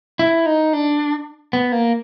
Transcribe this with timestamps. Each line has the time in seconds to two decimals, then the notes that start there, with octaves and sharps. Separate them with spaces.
0.19 E4
0.46 D#4
0.73 D4
1.53 B3
1.72 A#3